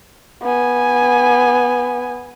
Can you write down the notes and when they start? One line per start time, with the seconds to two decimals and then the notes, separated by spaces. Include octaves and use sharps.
0.42 B3 G#5